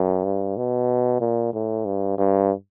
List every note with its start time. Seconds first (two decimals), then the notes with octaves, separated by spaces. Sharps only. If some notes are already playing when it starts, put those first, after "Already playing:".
Already playing: F#2
0.25 G2
0.57 B2
1.21 A#2
1.53 A2
1.85 G2
2.18 G2